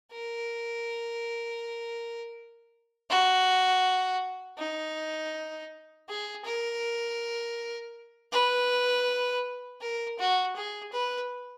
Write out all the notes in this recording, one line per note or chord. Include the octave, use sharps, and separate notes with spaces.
A#4
F#4
D#4
G#4
A#4
B4
A#4
F#4
G#4
B4